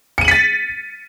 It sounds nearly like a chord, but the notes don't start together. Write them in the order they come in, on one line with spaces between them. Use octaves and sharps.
C#7 D#7 F#7 B6 A6